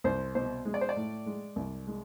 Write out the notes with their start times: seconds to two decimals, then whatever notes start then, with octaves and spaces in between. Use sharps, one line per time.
0.04 C2 C5
0.35 B2 C5
0.65 G#3
0.74 D5
0.81 C5
0.89 D5
0.96 A2
1.26 G#3
1.56 C2
1.87 G#3